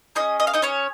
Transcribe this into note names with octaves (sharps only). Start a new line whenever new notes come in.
C#4 D#4 G#4 D#5
D#5
F5
D#4 D#5
C#4 C#5